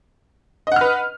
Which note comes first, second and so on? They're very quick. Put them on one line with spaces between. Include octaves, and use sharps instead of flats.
D#5 F#5 F6 B4